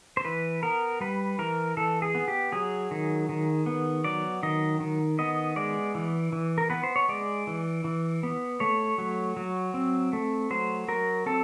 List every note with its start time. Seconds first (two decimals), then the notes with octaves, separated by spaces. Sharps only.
0.17 C5
0.25 E3 B4
0.63 B3 A#4
1.00 G3 B4
1.39 E3 A#4
1.77 E3 A4
2.02 G#4
2.15 B3
2.28 G4
2.52 F#3 G#4
2.91 D#3
3.29 D#3
3.66 B3
4.04 F#3 D5
4.43 D#3 D#5
4.80 D#3
5.19 B3 D#5
5.56 G#3 D5
5.95 E3
6.32 E3
6.58 A#4
6.70 B3 B4
6.83 C5
6.96 C#5
7.09 G#3 D5
7.47 E3
7.84 E3
8.23 B3
8.60 A3 C#5
8.98 F#3
9.37 F#3
9.74 C4
10.13 A3
10.50 F#3 C5
10.88 F#3 A#4
11.26 C4 A4